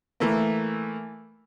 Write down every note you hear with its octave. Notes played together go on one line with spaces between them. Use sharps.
E3 A3 A#3